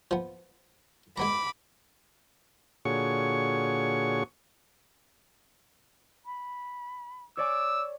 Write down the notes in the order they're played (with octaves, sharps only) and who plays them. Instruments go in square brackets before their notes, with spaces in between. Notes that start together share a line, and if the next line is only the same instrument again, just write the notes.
[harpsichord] F3 B3
[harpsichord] G#3 B3 A#5 [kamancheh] B5 D6
[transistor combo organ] A#2 D3 F#4 G#4 C#5 C#6
[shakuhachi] B5
[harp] C#5 D5 G#5 [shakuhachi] D6 [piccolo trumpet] E6